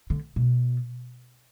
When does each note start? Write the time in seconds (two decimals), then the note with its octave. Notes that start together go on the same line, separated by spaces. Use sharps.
0.10 D3
0.36 B2